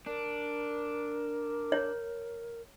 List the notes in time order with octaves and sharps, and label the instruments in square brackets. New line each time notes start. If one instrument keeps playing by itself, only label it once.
[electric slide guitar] D4 [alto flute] A#4
[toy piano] C#5